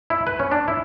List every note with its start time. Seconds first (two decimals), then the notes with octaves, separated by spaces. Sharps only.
0.10 E4
0.27 B4
0.40 C#4
0.52 D4
0.68 E4